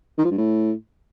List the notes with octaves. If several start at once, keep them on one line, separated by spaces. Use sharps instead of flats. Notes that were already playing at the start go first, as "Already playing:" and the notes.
D#3
F3
G2
A2